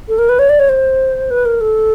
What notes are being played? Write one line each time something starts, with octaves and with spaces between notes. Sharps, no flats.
A4
A#4
B4
C#5
D5
C#5
C5
B4
A#4
A4